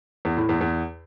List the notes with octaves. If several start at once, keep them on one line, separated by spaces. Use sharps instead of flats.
E2
A2
E2
E2